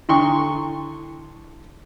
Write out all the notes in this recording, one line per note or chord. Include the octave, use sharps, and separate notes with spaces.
D3 E4 A4 G5 C6 C#6